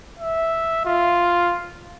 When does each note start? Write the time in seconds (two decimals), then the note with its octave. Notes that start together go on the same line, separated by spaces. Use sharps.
0.20 E5
0.86 F4